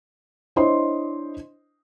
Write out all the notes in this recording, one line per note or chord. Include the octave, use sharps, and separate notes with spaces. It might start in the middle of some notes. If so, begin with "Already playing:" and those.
D4 E4 C5 C#5 D#5 C6